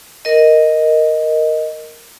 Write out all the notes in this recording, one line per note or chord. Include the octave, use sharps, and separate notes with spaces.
A#4 D#5